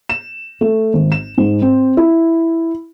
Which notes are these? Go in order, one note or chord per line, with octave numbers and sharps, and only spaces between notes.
E7
A3
G#1
E7
G#2
C4
E4